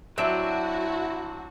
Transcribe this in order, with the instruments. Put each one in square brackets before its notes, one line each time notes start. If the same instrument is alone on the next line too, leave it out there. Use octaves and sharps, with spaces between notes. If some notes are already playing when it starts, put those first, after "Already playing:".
[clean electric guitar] F#3 C4 D4 [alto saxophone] E4 [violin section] F#4 [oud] E5